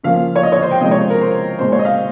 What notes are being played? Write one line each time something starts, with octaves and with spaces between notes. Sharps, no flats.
C#3 F3 A#3 C#4 F5
C#5
D#5
C#5
C5
G5
C3 F3 G#3 C#4 D#5
C#5
C5
A#4
C5
A#2 G#3 C4 C5
C#5
D#5
F5